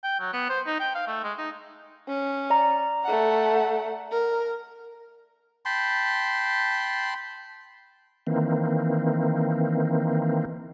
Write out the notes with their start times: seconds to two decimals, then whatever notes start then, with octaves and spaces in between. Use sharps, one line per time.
0.03 G5
0.20 F#3
0.33 B3
0.49 C5
0.66 D#4
0.80 G5
0.95 F5
1.07 A3
1.24 G#3
1.38 D#4
2.08 C#4
2.50 D5 A#5
3.04 A3 F#5
4.12 A#4
5.65 G5 A5 B5 C6
8.27 D#3 E3 A#3 C4